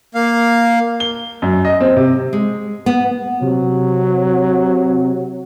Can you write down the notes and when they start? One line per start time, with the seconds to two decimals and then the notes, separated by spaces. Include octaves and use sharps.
0.15 A#3 F5
1.00 G7
1.42 F#2
1.65 D#5
1.81 C4
1.96 C3
2.33 G#3
2.86 B3
3.41 C3 F#3